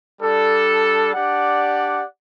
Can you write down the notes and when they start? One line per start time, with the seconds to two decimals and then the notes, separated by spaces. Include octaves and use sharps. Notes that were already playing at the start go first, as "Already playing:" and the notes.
0.22 G3 D4 A4
1.14 D4 G4 D5 F#5